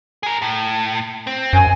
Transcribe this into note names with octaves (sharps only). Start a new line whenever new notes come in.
G#4 A#4
A2
C4
F#2 G#5